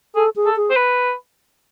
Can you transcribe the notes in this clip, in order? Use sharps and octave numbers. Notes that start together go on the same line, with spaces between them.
G#4 A4
G#4
A4
G#4
C5
B4